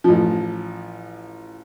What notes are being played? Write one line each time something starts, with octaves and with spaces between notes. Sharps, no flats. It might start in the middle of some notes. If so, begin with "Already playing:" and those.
A1 F3